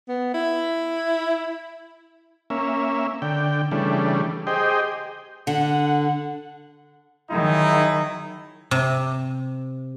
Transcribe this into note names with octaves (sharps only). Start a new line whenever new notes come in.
B3
E4
A#3 C#4 E5
D3 G5
C#3 E3 G3 A3 D4
G4 G#4 C5 D#5 G5
D3 F#5
D#3 F#3 D#4 E4 G#4
C3